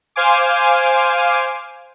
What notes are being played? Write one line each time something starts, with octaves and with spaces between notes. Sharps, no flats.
C5 F5 G#5 D6